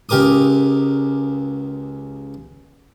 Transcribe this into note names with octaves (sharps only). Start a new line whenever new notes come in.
C#2 G4 A#4 D6 D#6